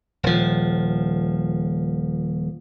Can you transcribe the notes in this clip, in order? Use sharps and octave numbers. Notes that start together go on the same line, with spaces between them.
D#1 F3